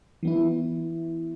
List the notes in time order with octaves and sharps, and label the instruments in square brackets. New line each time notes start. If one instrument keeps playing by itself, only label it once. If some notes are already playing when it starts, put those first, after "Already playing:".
[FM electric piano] E3 B3 E4